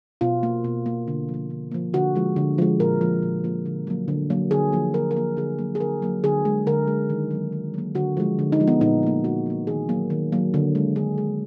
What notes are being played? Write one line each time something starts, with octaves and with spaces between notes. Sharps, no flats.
B2 F4
A#3
B2
A#3
D3
F3
A#3
D3
F3 A#3
D3 F#4
F3 G#3
D3
F3 G#3
A#2 A#4
F3 A#3
A#2
F3 A#3
D3
F#3 A#3
D3
F#3 A#3
D3 G#4
F3 A#3
D3 A#4
A#4
F3 A#3
D3 G#4
F#3 A#3
G#4
D3 A#4
F#3 A#3
D3 G#4
G#3
D3 A#4
G#3
D#3
F#3 A#3
D#3
F#3 A#3
D3 F#4
F3 G#3
D3
D#4
F3 G#3
B3
A#2 D#4
F3 A#3
A#2 F#4
F3 A#3
D#3 G#4
F#3 A#3
D#3
F#3 A#3
D3
G#3
D3 G#4
G#3